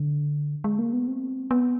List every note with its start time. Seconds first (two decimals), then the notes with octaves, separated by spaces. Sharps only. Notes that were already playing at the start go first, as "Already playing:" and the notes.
Already playing: D3
0.64 G#3
0.79 A#3
0.93 B3
1.08 C4
1.51 B3